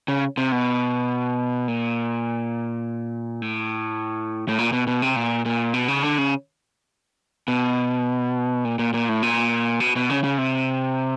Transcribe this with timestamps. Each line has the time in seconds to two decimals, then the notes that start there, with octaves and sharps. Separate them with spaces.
0.08 C#3
0.37 C3
0.52 B2
1.68 A#2
3.42 A2
4.48 A2
4.59 A#2
4.72 B2
4.87 B2
5.02 C3
5.16 A#2
5.45 A#2
5.74 B2
5.88 C#3
6.03 D3
6.18 C#3
7.48 B2
8.65 A#2
8.79 A#2
8.94 A#2
9.09 A2
9.23 A#2
9.80 B2
9.96 B2
10.10 C#3
10.24 C#3
10.38 C3